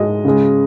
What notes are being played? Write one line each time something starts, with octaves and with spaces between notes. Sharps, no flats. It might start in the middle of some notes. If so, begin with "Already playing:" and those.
Already playing: G#2 G#3 D#5
C#3 G#3